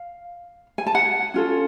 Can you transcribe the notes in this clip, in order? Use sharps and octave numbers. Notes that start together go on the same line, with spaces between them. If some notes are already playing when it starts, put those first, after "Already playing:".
Already playing: F5
G#5
A5
F#5 G#5
C#4 F4 A4